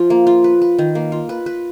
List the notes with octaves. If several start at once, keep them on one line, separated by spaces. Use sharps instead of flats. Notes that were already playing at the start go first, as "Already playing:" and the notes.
Already playing: F3 F4
A#3
F4
B4
B4
D#3
A#3
F4
B4
B4